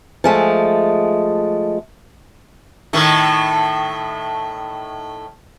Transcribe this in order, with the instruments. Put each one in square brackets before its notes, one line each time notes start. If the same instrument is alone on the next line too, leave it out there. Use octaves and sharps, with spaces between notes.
[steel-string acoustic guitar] F3 G#3 A3
[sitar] A2 D#3 A3